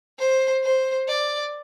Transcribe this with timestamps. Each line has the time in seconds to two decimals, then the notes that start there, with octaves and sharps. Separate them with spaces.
0.19 C5
0.63 C5
1.08 D5